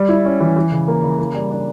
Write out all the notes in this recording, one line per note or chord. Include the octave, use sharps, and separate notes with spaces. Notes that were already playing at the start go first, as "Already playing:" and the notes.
Already playing: G3
E4
C#4
E3
E3
C#3
A#3
C#3
A#3
G3
D4